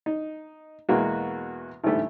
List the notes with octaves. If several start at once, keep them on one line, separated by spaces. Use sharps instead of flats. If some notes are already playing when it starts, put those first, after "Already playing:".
D#4
E2 B2 G#3 A#3 F#4
A1 D2 G#2 G3 A3 G4